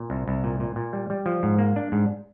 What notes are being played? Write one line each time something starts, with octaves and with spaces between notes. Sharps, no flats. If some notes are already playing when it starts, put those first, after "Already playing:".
Already playing: A#2
C2
C2
A#2
A#2
A#2
G3
G3
F3
G#2
A#3
D4
G#2